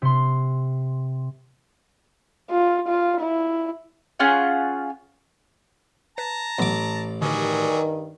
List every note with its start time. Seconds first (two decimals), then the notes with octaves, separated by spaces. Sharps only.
0.02 C3 C6
2.51 F4
2.88 F4
3.21 E4
4.20 C#4 F4 G#4 F#5
6.18 B4 A5 A#5
6.59 A1 E3 F#3 B3 D6
7.22 G2 D3 D#3 F#3 G3 G#4 A#4